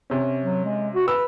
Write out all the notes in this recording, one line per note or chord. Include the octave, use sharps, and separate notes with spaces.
C3 C#4
F#3
G#3
F#4
B4 E6